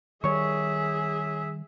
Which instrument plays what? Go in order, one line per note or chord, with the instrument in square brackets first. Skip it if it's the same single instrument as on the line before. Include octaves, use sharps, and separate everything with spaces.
[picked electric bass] D#3 G3 [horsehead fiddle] G#4 E5 [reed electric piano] C#5 C#6